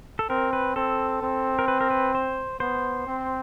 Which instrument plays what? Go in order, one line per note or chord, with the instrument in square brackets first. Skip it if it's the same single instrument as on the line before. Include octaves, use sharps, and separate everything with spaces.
[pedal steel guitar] A4
[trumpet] C4 [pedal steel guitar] A#4
[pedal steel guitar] B4
[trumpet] C4 [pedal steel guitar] A4
[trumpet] C4
[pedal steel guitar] A#4
B4
A#4
B4
C5
[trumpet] B3 [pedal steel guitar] C5
[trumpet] C4